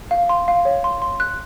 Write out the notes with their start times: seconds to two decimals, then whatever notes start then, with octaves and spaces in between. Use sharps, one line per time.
0.11 F5
0.29 C6
0.48 F5
0.65 C#5
0.84 C6
1.02 C6
1.20 F#6